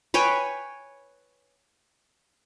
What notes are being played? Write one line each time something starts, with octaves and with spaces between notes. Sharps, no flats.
B4 C#5 G5 G#5